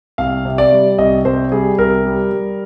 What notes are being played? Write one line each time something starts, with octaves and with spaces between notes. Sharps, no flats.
C2 F5
C3
D5
G3
C2 D#5
C2 C5
G3 G#4
C2 A#4
G3
G3